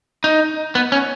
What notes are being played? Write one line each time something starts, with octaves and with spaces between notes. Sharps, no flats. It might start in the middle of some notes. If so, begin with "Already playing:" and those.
D#4
B3
C#4